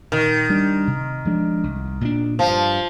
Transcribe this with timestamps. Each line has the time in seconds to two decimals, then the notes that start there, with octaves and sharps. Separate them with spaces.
0.12 A#2 D#3
0.50 G3 D4
0.87 C3
1.25 F3 G#3 D4
1.63 C2
2.01 A#2 G#3 D4
2.39 G2 F3